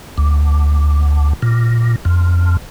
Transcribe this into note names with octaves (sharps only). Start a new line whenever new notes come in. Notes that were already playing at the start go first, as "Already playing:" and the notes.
D2
A#2
F2